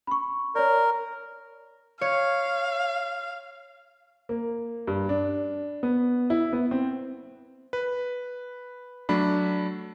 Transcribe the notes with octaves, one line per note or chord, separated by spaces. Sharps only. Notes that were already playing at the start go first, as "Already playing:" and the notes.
B5 C#6
A#4 C#5 D5
C#5 F5
A#3
G2
D4
B3
E4
B3
C4
B4
F#3 A3 D4 B5